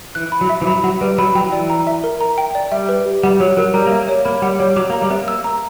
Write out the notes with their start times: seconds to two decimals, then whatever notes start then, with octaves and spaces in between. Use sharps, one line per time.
0.15 E3 F#6
0.32 B5
0.41 F#3
0.50 E5
0.62 E3
0.67 F#3 B5
0.84 F#3 F#5
1.01 G3 B4
1.18 F#3 B5
1.35 F#3 G5
1.44 E3
1.52 D5
1.70 A#5
1.87 E5
2.04 A#4
2.21 A#5
2.38 G5
2.55 D5
2.72 G3 E5
2.89 B4
3.06 G4
3.23 G3 F#5
3.40 F#3 C#5
3.57 F#3 A#4
3.74 G3 A#5
3.87 A#3 E5
4.00 G3
4.08 C#5
4.25 A#3 B5
4.42 G3 F#5
4.59 G3 C#5
4.76 F#3 D6
4.90 A#3
4.93 A#5
5.02 G3
5.10 A#3 B3 E5
5.28 E6
5.44 A#5